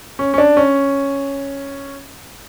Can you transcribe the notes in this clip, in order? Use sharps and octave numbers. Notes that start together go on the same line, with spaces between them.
C#4
C#4
D4
C#4